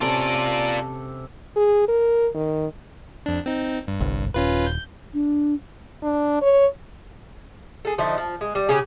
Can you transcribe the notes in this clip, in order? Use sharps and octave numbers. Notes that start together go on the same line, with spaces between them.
C3 C#4 F4 A4 D5
G#4
A#4
D#3
F2 D4
C4 D#4
G2
G1 C2
D#1 C#4 F4 B4
G6
D4
D4
C#5
G#4 A4
D3 F3 D#4 E4
F3
G#3
G3
C#3 C#4 G4 G#4